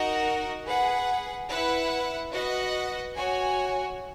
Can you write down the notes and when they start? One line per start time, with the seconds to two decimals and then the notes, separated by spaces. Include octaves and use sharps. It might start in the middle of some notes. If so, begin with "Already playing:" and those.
Already playing: D#4 F#4 A#4 D#5 F#5
0.66 G#4 B4 F#5
1.49 E4 B4 F#5
2.33 F#4 B4 D#5 F#5
3.16 F#4 C#5 G#5